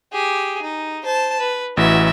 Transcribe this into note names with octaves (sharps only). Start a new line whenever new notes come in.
G4 G#4
D#4
C5 A5
B4
A1 E3 F#4 E5